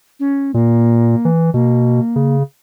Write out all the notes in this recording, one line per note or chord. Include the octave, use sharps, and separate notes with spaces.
C#4
A#2 A#3
E3
B2 A#3
C#3